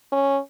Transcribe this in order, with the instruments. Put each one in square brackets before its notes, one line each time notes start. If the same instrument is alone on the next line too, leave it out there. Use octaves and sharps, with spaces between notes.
[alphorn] C#4